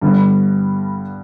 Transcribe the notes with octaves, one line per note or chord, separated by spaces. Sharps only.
G2 D3 G3 B3